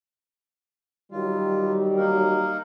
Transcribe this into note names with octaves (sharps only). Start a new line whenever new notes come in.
D#3 F#3 G3 F4
A#3 D#4 A#4